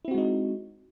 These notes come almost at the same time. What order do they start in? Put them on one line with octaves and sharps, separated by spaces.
E4 C4 F#4 G#3 D#4